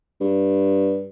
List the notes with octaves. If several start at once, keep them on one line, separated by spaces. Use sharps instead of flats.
G2